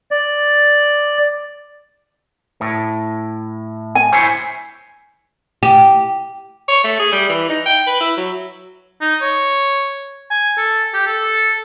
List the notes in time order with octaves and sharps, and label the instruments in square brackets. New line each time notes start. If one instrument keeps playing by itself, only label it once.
[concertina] D5
[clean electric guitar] A2
[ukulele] G#5
[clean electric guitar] E4 C5 C#5
[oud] G4
[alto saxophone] C#5
A3
G#4
G3
E3
D#4
G5
B4
E4
F#3
[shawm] D#4
C#5
G#5
A4
G4
A4